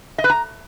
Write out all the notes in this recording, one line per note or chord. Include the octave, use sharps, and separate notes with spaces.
D#5
B4
A#5